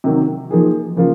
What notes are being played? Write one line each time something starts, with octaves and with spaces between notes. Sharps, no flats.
C3 D#3 F#3
F3 A#3 D#4 G#4
C#3 F3 A#3 F4